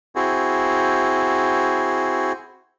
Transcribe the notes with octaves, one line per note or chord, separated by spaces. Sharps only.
C4 E4 F#4 G#4